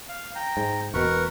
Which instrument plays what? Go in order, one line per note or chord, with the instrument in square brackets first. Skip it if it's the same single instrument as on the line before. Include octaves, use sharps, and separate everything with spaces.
[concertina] F5
G5 A#5
[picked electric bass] G#2
[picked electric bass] E1 B2 [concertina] A#4 B4 C#6